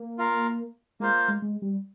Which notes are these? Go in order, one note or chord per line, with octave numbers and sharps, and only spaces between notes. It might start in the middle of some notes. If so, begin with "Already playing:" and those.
Already playing: A#3
F4 A#4 F5
G#3 A#3 F4 C5
G#3
G#3
G3